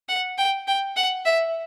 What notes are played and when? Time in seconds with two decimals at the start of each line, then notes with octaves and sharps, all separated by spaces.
0.09 F#5
0.38 G5
0.67 G5
0.96 F#5
1.25 E5